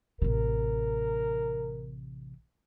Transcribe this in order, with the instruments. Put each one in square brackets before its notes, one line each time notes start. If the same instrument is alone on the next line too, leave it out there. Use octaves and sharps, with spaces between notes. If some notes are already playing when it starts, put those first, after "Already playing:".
[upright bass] A1 C3 [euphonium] A#4